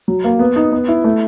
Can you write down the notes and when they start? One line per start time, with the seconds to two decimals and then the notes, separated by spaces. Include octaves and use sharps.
0.08 F#3
0.24 A#3
0.39 B3
0.56 D#4
0.72 B3
0.88 E4
1.04 A3